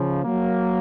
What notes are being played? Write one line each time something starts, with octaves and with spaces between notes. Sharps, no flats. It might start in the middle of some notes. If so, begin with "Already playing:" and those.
Already playing: C#3 F3
F#3 A#3